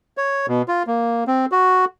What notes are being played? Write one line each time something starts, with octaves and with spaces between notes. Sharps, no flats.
C#5
B2
F4
A#3
C4
F#4